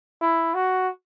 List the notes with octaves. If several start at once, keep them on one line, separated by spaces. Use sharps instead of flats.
E4
F#4